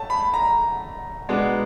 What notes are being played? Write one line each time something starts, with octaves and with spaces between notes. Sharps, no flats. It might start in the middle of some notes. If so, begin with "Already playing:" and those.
Already playing: A3 C#4 A5
B5
A#5
B2 G#3 B3 D4